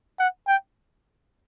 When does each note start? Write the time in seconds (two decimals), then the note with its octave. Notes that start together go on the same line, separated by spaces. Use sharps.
0.19 F#5
0.48 G5